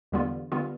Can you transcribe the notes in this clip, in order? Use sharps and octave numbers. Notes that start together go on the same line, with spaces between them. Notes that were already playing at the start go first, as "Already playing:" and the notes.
E2 D3 G3 B3 F4
D3 G3 B3 F4